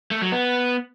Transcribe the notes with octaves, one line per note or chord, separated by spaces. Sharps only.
A3
F#3
B3